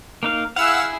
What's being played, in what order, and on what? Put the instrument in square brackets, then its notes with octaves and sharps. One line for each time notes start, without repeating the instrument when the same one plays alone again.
[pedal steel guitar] A#3 D#4 F5
[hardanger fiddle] E4 G#4 [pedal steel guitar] F5 [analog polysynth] F#5 E6